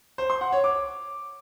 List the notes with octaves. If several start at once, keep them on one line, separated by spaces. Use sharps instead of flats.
C5
C6
F#5
C#5
D6